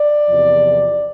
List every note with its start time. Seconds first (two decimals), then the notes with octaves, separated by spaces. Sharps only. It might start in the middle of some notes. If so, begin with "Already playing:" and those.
Already playing: D5
0.29 E2 C3 F3